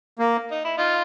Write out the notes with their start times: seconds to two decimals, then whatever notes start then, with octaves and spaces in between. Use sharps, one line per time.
0.19 A#3
0.51 D#4
0.65 E4
0.78 D#4 F4